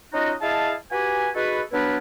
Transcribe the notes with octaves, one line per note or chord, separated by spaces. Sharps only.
C#4 D#4 F4 F#4 D#5
E4 G#4 D#5 F5 A5
F#4 G4 B4 G#5
D#4 F#4 G#4 A4 B4
F#3 B3 D4 E4 F4 B4